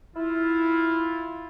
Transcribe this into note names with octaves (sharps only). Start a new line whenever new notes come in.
E4 F4